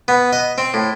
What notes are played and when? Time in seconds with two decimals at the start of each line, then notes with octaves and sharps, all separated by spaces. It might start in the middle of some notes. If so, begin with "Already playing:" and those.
0.08 B3
0.33 D#5
0.58 C4
0.74 A2